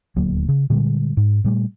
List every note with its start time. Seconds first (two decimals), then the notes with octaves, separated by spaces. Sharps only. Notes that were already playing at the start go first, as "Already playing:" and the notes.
0.16 D#1 D2 F#3 A#3
0.48 C#3
0.70 A#2 D3 G3 G#3
1.17 G#2
1.44 A#2 G3 A3